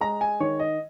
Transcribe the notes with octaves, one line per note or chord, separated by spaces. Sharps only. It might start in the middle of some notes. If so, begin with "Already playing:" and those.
G#3 A#5
G#5
D#3 C#5
D#5